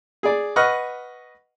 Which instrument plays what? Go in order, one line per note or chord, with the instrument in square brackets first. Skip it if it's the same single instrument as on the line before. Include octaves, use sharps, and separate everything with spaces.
[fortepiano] G#4 D5
B4 D#5 F#5 C#6 F6 F#6